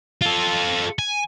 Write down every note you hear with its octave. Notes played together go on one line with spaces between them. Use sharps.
F4 A4
G#5